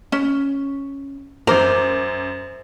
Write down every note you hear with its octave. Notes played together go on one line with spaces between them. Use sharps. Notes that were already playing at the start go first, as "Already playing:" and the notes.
C#4
F#2 A#4 C5 D6 F7